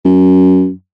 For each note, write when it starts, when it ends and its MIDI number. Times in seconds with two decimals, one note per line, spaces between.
0.05 0.70 42